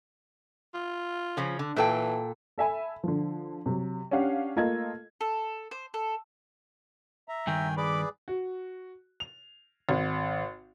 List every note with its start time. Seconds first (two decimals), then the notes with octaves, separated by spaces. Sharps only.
0.74 F4
1.37 C#3 F3 C#4
1.59 D3
1.76 A#2 E3 A4 G5
2.58 A4 E5 G#5 B5
3.03 D3 F3
3.66 C3 F#3
4.11 C#4 D4 G4 F5 F#5
4.56 A3 A#3 F4 A4 D#5 G#6
5.21 A4
5.71 C5
5.94 A4
7.28 E5 A#5
7.47 G2 D#3 G5 G#5
7.77 G#4 B4 D5 B5 D6
8.28 F#4
9.20 F7
9.89 G#1